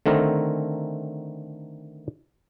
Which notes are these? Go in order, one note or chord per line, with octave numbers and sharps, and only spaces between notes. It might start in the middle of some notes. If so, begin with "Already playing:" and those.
D3 D#3 A3 C4 A#4